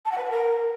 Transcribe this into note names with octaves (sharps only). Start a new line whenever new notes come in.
A5
F#5
B4
F#5
A#4